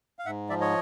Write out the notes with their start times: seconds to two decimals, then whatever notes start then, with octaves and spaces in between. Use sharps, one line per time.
0.19 F5
0.26 G#2 E5 F#5
0.49 F3 D5 E5
0.61 C#5 D#5